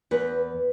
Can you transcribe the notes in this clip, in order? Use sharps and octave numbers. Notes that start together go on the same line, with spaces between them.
E2 B4